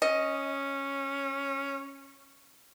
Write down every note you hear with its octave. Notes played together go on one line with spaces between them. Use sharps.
C#4 D#5